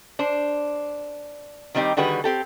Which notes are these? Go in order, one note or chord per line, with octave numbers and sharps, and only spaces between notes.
D4 C5
D#3 G3 C4 D#4 G4
D3 D#3 G3 F#4 G#4 B4
C4 G4 A4